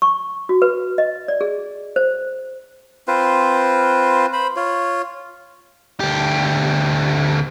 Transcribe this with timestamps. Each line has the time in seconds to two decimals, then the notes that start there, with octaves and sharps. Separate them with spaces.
0.02 C#6
0.49 F#4
0.62 B4
0.98 D#5
1.28 D5
1.41 G#4
1.96 C5
3.08 C4 F4 B4 C5
4.33 C5 B5
4.56 F4 C#5
6.00 D2 G4